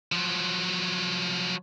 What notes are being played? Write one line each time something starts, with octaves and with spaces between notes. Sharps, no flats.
F3 F#3